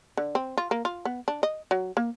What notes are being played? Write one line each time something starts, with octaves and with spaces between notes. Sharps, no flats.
D3
C4
F4
A#3
F4
B3
D4
D#5
F#3
A#3